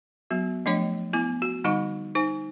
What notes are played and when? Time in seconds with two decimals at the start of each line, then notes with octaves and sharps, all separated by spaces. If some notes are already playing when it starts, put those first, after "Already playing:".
0.31 F#3 B3 F#4
0.66 F3 A3 D4 C#5 D#5
1.13 B3 E4 G#5 D6
1.42 F#4
1.64 D3 G3 D#4 D#5 C#6
2.15 D#4 C5 G#5